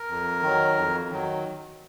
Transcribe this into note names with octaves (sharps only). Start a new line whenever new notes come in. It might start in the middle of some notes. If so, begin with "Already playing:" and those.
Already playing: A#4
F2
D#3 F#3
F2
D#3 F#3